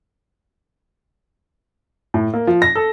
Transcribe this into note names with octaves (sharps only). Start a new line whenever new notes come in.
A2
A#3
F3
A#6
A4